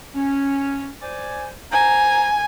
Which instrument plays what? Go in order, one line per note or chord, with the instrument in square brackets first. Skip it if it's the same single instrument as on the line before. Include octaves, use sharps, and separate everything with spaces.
[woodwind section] C#4
C5 D5 G#5
[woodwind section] C5 A#5 [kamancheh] G#5